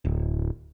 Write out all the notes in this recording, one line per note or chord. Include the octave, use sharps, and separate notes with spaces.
D1